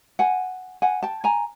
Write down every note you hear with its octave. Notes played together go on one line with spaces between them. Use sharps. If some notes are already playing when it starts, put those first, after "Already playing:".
F#5 G#5
F#5 G#5
G5 A5
G#5 A#5